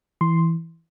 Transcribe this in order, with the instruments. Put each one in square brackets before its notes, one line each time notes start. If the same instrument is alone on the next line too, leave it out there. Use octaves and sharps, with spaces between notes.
[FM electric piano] E3 C6